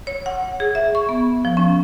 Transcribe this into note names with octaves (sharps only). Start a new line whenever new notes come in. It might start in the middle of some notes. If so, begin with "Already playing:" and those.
C#5
F#5
G#4
E5
C#6
B3
F3
C#4